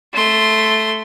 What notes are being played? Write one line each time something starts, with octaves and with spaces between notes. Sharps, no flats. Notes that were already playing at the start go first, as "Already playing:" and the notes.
A3 C6